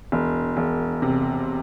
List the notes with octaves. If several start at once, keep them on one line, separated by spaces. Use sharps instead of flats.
E1
E1
C3